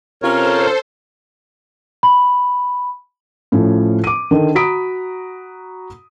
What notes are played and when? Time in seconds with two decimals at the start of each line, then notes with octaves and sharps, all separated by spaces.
0.22 C3 C#4 F4 A4 A#4 C5 C#5
2.03 B5
3.52 A2 F3 C#4
4.04 D6 D#7
4.31 D3 D#3
4.55 F#4 A#5 B5 D#6 B6 D7